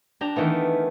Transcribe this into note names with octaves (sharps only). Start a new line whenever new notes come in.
D4 G4 A#5
D#3 E3 A3 B3